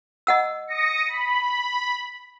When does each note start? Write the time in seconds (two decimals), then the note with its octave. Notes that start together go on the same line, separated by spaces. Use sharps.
0.27 D#5 F#5 E6
0.67 D#6 A#6 C#7
1.09 B5